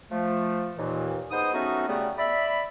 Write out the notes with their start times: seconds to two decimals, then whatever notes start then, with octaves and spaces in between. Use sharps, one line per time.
0.11 F3 A3
0.76 D#2 A#2 E3
1.31 G#3 B3 D#4 C5 D#6
1.54 F#3 A3 B3 C#4 D#4 F#4
1.89 C#3 G3 A3 B3
2.18 D5 E5 B5